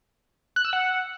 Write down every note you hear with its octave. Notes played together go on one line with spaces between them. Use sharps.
F#6
E6
F#5